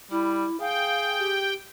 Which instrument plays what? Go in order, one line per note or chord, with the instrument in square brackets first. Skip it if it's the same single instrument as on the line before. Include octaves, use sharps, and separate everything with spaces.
[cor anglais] G3 [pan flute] E4
[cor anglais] G#4 [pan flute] F5 [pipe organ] G5
[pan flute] G4